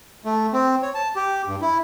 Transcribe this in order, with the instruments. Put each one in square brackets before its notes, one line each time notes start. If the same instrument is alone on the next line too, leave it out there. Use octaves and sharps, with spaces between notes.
[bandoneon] A3
C4
C#5
A5
G4
G2
E4